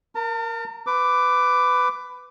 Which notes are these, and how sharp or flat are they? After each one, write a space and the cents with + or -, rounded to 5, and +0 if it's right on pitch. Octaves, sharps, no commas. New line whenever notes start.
A#4 +0 A5 +45
B4 +20 D6 +0